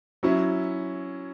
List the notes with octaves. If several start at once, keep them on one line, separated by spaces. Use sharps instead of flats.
F#3 C#4 E4